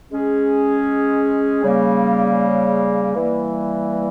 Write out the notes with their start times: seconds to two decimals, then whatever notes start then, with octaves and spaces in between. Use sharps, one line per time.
0.11 G#3 C#4 G#4
1.62 C#3 G3 A#3
3.14 E3 G3 A#3